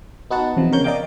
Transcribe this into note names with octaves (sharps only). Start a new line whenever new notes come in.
B3 D#4 F#4 B4 F#5 A5
E2 C3 F3
C#3 A#4 C#5 G6
A#4 D5 D#5 F5 G5 D6